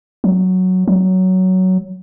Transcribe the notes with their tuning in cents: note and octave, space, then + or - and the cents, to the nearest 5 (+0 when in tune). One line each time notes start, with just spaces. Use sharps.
F#3 +0
F#3 +10